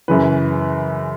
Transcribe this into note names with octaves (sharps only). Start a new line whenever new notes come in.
F#2 C#3 E3 B4